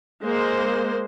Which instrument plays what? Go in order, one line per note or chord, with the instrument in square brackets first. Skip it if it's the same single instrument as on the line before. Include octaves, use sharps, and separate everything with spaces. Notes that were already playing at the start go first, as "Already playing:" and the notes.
[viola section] G#3 A#3 C5